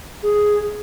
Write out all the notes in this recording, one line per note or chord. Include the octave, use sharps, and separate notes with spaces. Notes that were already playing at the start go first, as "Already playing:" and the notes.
G#4